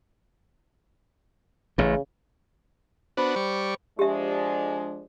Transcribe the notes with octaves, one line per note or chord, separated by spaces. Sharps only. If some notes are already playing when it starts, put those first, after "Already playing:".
A1 A2 C#3
B3 D4 F#4 C5 B5
G3 D5 C#6
F3 G#3 D4 G4 E5